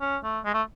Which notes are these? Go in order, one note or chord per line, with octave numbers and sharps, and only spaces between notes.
C#4
A3
G#3
A3